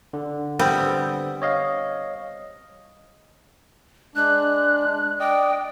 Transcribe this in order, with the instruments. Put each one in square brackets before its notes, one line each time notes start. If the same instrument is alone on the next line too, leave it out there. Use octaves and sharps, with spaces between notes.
[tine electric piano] D3
[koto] G3 B3 C4
[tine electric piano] C#5 D#5 F5
[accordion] G#3 D4 [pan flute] F#6
[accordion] D5 D#5 [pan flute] G5